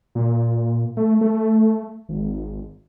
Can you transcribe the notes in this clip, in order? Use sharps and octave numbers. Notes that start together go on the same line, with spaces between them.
A#2
A3
A3
G#1